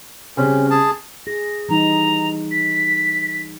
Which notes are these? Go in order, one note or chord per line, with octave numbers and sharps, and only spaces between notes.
C#3 G3 C4 C#4
G#4 A5
G#4 A#6
E3 G3 D#4 A#5
B6